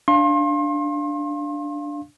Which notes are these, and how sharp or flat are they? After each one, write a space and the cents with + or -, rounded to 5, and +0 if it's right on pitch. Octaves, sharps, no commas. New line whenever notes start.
D4 +0 F5 -5 C6 +35